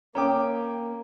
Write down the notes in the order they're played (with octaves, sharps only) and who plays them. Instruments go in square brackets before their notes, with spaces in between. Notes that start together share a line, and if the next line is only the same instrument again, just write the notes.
[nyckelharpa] A#3 [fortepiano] C#4 G5 D6 [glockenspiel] A#5